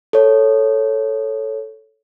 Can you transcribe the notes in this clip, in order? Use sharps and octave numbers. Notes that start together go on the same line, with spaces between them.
A4 C#5